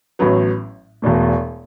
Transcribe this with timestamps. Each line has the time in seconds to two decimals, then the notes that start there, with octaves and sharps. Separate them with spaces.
0.19 A1 A2 F#3 B3
1.02 E1 E2 B2 A3